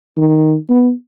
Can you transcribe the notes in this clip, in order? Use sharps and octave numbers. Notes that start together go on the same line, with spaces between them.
D#3
B3